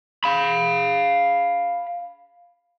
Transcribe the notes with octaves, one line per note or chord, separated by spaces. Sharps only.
F5 B5